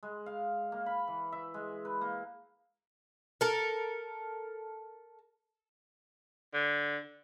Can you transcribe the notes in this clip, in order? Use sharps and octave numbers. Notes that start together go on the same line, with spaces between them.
G#3
F5
A#3
B5
E3
E5
G#3
B4
A#3
A4 A#4
D3